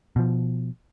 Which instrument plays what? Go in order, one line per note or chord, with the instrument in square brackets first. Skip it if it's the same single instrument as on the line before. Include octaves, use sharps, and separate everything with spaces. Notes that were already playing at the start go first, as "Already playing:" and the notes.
[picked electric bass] B2 F3